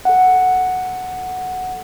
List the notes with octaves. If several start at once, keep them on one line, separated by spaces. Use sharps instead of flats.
A4 F#5